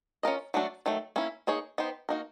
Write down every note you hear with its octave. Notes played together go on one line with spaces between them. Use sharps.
C#4 F4 A#4 D#5
F#3 A3 D4 F#4
D#3 F#3 A3
A#3 C#4 E4
A#3 D#4 G#4 C#5
B3 D#4 G4 C5
A#3 D#4 F#4 A#4